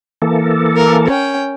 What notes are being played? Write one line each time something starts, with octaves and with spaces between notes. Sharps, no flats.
E3 A#3 A4
A#4
C#4 G5